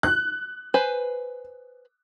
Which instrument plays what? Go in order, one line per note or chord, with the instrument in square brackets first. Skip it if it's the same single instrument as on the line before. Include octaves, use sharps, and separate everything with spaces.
[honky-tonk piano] F#6
[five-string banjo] B4 C5 G#5